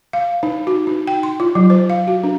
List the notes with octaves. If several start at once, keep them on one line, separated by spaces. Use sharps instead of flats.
F5
D#4
F#4
D#4
G5
C6
F4
F#3
C5
F5
F#4
D4